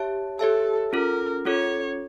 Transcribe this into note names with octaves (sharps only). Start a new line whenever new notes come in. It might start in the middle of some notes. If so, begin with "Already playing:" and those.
Already playing: G4 C#5 E5 A5
G4 A4 C#5 E5 A5
C#4 F4 A4 A#4
C#4 F4 A4 C#5